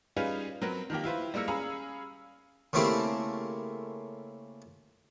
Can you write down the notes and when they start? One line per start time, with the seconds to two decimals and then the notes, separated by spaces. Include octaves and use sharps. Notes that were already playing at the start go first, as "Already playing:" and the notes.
0.16 G3 C#4 D#4 F4 G#4 B4
0.62 F#3 C4 A#4 B4
0.90 D#3 F3 A#3 G4
1.04 E4 F4 B4 C5
1.34 G3 G#3 A#3 A#4 E6 C#7
1.48 C#4 G#4 F5 A#5 B5
2.73 C#3 A3 A#3 C4 E4 G4